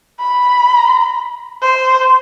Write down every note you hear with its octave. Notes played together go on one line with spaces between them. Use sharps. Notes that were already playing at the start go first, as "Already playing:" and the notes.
B5
C5